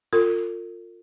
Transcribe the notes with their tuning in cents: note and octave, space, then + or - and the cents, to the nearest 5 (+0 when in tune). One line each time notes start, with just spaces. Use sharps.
F4 +10 A4 +45